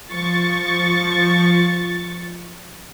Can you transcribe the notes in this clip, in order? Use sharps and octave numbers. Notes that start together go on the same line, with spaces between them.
F3 C#6 A6